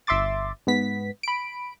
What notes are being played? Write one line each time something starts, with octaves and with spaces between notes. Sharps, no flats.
G1 E5 C6 D6 A6
G#2 B3 B6
B5 D7